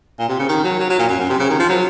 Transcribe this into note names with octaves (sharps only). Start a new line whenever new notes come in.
A#2
C3
C#3
D#3
F#3
F#3
F#3
A#2
F#2
F#2
C3
C#3
D#3
F3
F#3